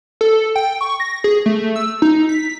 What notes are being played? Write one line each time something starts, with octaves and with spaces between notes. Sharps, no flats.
A4
G5
C#6
A#6
G#4
A3
E6
D#4
B6